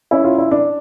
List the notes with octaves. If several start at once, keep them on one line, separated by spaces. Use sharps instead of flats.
C#4 E4
F4
E4
D4